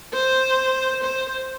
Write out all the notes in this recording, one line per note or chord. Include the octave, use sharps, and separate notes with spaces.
C5
C5